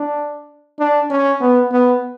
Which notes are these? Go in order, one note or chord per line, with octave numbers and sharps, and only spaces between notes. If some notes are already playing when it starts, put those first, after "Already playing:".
Already playing: D4
D4
C#4
B3
B3